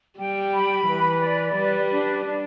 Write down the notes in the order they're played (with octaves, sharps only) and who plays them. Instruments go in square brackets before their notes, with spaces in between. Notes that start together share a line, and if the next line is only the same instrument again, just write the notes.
[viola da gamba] G3 [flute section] G5
[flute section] B5
[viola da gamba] E3 [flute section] B4
[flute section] D5
[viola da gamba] G3 [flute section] B4
[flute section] D4
D4